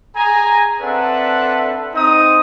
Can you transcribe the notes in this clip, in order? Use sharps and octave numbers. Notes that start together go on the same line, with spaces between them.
G#4 G#5 A#5
C4 D4 A4 B4 E5 F#5
C4 D#4 D#6